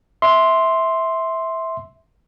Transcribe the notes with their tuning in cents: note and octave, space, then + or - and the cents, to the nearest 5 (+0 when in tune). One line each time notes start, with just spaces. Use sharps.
E5 -15 C6 +0